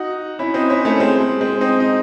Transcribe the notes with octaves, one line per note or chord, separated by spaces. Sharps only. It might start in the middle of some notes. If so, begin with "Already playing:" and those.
Already playing: D#4 F#4
C#4 E4
C4 D#4
C#4 E4
A3 C#4
G#3 C4
G#3
G#3 C4
C4 D#4
D#4